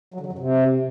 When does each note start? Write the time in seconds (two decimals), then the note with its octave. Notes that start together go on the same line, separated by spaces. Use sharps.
0.14 F#3
0.20 D3
0.26 F#3
0.32 F#2
0.39 C3